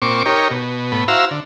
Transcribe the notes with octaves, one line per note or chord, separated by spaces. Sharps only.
A#2 C4 C#6 D6
D#4 G4 A#4 C#5
B2
A2 B3
E4 F#4 C5 F5 A#5 E6
D3